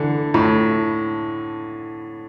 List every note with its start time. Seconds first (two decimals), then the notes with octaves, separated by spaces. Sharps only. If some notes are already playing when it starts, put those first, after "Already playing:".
Already playing: D3 E3
0.34 A2